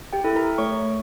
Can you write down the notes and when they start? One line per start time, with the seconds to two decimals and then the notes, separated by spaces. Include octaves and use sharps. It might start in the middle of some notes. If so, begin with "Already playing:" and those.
0.13 G4 G5
0.24 E4 A4
0.36 A#4 A#5
0.58 A3 C#5 C#6